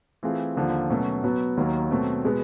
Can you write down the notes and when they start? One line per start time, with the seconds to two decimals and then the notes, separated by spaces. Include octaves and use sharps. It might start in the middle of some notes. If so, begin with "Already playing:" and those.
0.23 E3 A3 C4 F4 G#4
0.56 D#2 D3 F3 A#3
0.90 B2 F#3 A3 C#4
1.23 B2 F#3 B3
1.57 D#2 D#3 F#3 A#3
1.91 B2 F#3 A3 C4
2.24 B2 G#3 B3